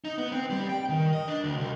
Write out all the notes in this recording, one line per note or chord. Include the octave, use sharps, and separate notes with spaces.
D#4
B3
C4
G3
G5
D#3
D#5
D4
D2
C2